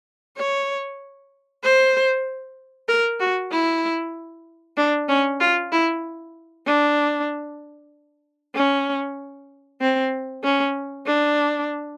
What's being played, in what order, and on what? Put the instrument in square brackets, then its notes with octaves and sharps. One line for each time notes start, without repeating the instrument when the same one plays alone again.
[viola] C#5
C5
A#4
F#4
E4
D4
C#4
F4
E4
D4
C#4
C4
C#4
D4